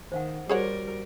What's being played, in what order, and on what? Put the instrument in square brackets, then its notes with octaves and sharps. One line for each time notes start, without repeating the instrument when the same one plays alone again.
[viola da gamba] D#3 [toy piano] C5 F5 F#5
[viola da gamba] G3 A#4 [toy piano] F#4 C5 C#6 [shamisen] G#4 C#5 F#5